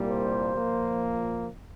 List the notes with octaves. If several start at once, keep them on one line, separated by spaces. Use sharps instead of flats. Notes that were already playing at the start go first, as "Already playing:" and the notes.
Already playing: C2 A#2 G3 A#3
C5
A#2 F3 A#3